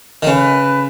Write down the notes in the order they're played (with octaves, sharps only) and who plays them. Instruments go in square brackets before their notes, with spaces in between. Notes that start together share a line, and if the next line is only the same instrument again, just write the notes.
[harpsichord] D#3
[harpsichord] C#3 [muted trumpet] B4